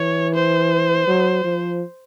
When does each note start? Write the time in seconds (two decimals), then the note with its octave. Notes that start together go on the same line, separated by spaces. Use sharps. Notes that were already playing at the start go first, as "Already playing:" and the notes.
Already playing: E3 C#5
0.34 C5
1.07 F#3
1.44 F3